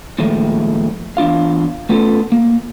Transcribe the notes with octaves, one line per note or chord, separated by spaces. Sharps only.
A#2 D#3 F3 G#3 A3
E2 D4 F4 F5
A3 B3 C#4 F4 G#4 A4
A#3